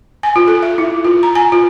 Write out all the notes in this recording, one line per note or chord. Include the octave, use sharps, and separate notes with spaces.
G#5
F4
A4
E5
E4
F4
A#5
G#5
F4